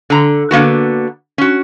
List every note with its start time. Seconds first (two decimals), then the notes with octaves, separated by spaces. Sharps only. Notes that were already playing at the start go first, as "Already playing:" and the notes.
0.10 D3 A#5
0.51 D3 A#3 B3 F#4
1.38 C#4 F#4